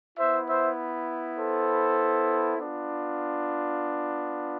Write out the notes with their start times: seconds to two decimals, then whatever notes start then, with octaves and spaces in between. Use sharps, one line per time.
0.18 B3 E4 C5 E5
0.48 C5 E5
1.38 A4 C5
2.58 B3 D4 F4